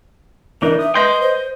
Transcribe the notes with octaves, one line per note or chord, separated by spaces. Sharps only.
E3 D4 D#4 A#4
E5 D#6
B4 D#5 C6 G6
C5